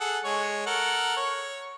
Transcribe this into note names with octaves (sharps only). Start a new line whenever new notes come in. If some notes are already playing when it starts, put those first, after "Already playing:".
G#4 A4 F#5
G#3 C#5
A4 A#4 F#5
C#5